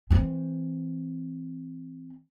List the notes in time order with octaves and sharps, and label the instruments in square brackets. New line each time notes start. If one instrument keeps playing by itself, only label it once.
[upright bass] E3 C4